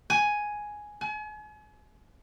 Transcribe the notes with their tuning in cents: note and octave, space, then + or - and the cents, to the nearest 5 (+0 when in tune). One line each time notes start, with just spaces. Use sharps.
G#5 +5
G#5 +40